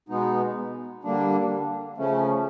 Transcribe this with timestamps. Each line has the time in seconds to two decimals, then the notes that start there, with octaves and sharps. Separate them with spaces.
0.09 B2 G#3 B3 D#4
1.04 D3 G3 A#3 D4
1.98 C#3 F3 A3 C#4